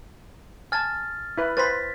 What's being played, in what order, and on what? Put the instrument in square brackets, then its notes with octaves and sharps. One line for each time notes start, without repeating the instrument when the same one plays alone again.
[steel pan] G#5 A5 [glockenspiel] F6 A6
[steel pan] E4 B4
[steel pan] B4 C5 [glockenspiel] A6 B6